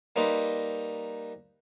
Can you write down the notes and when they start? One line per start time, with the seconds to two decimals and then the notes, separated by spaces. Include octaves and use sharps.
0.16 G3 A#3 D#4 B4 C5 D#5